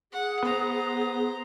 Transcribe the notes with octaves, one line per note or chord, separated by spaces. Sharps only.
G#4 F#5
B3 C5 A#5